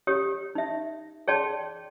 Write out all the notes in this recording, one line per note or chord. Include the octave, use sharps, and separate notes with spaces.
G4 C#5 D#6
D#4 E5
G#4 C#5 D5 G5 A5 C6